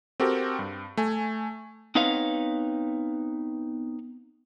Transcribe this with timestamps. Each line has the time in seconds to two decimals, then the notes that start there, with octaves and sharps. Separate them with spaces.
0.20 C4 F#4 G4 A4 A#4
0.59 G2
0.97 A3 G#5
1.95 B3 C4 D#4 B4 C#5 F5